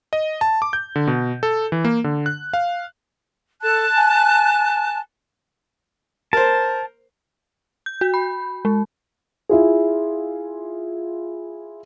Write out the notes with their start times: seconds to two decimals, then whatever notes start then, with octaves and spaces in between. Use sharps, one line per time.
0.13 D#5
0.41 A5
0.62 D6
0.73 G6
0.96 D3
1.07 B2
1.43 A4
1.72 E3
1.85 A#3
2.04 D3
2.26 F#6
2.53 F5
3.63 A4 A5 F#6
3.96 G#5
6.33 A#4 C5 A5
7.86 G6
8.01 F#4
8.14 B5
8.65 G#3
9.49 E4 F4 G#4